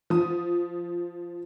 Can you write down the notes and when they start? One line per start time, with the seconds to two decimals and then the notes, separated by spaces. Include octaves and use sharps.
0.10 F3 D#6